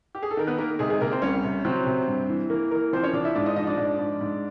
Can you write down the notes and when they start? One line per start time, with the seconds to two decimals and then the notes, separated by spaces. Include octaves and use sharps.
0.15 G4
0.23 G#4
0.31 A4
0.37 D#3 A#4
0.47 B3 B4
0.58 D#3 A#3 A#4
0.79 C3 G#3 G#4
0.90 G#3 G#4
1.01 C3 A#3 A#4
1.12 C4 C5
1.22 C2 C#4 C#5
1.44 C3
1.64 F#3 C4 C5
1.86 C3
2.08 G2
2.29 E3
2.50 E3 A#3 A#4
2.71 E3 A#3 A#4
2.93 F3 C4 C5
3.03 C#4 C#5
3.13 F3 D4 D5
3.25 E4 E5
3.35 G#2 D4 D5
3.46 D#4 D#5
3.56 F3 D#4 D#5
3.67 D4 D5
3.78 G#2
3.99 G#2
4.21 G#2